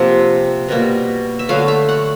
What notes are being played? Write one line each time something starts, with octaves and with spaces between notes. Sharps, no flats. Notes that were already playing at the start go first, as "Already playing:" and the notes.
Already playing: C3 F3 A#3 F#5
B2 G3 A#3
E5
D3 F#3 A3 F5
E5
F#5